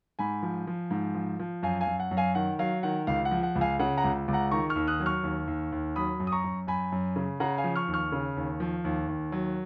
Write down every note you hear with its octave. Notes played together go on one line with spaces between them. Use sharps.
G#2 G#5 B5
F3
F3
G#2
F3
F3
F#2 F5 G#5
F5 G#5
F#2
F#5
F#2
F5 G#5
D#3 F#5
F#3 F5
D#3 F#5
C#2 F5
F#5
F3
F#5
C#2
F5 G#5
C#3 F#5
F#5 A#5
C#2
C#2
F#5 A#5
D#3 A#5 C#6
C#6 F6
D#2
D#6 F#6
F#3
C#6 F6
D#2
D#2
D#2
F#3 B5 D#6
F#2
D#6
A#5 C#6
F#2
F#2 G#5 B5
F#2
C#3
C#3 F#5 A#5
F5 G#5
F3
C#6 F6
D#2
C#6 F6
C#3
D#2
F3
D#2
D#2
F#3